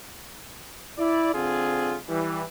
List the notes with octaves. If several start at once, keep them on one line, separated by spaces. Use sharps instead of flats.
E4 D5
D3 C4 F4 G#4
E3 G3